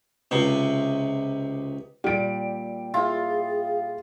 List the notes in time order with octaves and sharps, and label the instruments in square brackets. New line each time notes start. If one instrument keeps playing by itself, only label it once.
[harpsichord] C#2 C3
[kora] A#2 G3 [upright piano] G4 D7
[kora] E4 [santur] F4 [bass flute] G#4